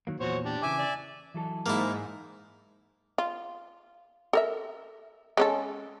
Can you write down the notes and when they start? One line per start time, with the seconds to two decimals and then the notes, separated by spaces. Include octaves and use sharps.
0.07 D#3 F#3 A#3
0.20 E2 A#2 F#4 C5 C#5
0.45 D4 G4
0.63 C#3 E3 G#4 E5 G#5 D6
0.79 D5
1.34 E3 F#3 A4
1.66 G#2 A#3 E4
3.18 F4
4.33 A4 A#4 E5
5.37 G#3 C#4 A4